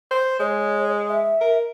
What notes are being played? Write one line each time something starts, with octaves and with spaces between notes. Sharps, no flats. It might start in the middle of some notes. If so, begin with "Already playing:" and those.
C5
G#3 C#5
E5
A#4